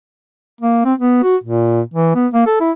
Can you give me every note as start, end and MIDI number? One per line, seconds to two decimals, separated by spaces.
0.61 0.85 58
0.85 0.93 60
0.98 1.21 59
1.23 1.36 66
1.44 1.81 46
1.94 2.14 52
2.15 2.27 59
2.33 2.44 58
2.46 2.60 69
2.60 2.71 64